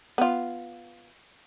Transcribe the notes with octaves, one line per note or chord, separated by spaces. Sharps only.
B3 F4